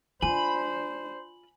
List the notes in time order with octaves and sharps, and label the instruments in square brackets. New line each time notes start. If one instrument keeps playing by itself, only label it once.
[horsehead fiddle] D4 C5 [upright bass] F4 [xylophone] G#5 [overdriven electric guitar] B5